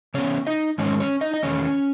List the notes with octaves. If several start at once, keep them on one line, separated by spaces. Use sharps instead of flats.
C#3 G#3 B3 C#4 C#5
D#4 D#5
G#2 D#3 G#3 C#4 C#5
C#4 C#5
D#4 D#5
D#5
E2 D#3 A3 C#4 C#5